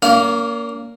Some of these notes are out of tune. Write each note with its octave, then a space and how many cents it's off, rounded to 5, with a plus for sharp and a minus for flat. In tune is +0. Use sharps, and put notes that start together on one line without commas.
A#3 +0 C#4 +45 F5 +0